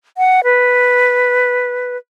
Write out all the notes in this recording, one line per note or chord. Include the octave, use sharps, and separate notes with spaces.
F#5
B4